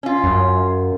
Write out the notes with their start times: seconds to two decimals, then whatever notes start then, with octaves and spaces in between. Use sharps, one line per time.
0.03 C#4 F4
0.24 F#2